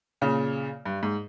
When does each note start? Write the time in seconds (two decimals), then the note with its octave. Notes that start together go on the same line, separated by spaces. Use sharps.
0.21 A#2 C#3
0.85 G2
1.03 G#2